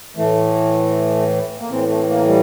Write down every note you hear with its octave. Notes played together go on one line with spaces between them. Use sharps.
A2 E3 A3
A#3
A2 E3 C4
A3
A#3
G3